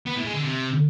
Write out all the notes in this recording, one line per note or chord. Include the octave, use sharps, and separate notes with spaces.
B3
A2
G#3
D3
C3